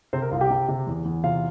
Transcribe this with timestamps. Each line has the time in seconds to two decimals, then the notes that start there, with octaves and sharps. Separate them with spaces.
0.13 C3 C4 C5
0.22 A#4
0.31 C2 F4 F5
0.41 G4 G5
0.50 C3
0.68 C3
0.87 E2
1.05 E2
1.24 C3 F4 F5